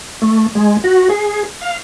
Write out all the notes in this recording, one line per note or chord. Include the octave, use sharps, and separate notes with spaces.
A3
G#3
F#4
G#4
F5